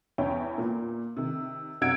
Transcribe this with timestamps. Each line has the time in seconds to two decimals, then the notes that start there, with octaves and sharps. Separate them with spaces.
0.18 E2 C#4 E4 C#5 G5
0.58 A#2
1.17 C3 D#3
1.81 F#2 C3 F#5 E6 G#6 D7